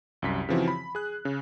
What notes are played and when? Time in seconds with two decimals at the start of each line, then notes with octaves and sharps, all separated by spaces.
0.22 C2 F#2 B6
0.49 C#3 E3 F3 C4 E4 F#4
0.68 B5
0.95 G#4 F#6
1.25 C#3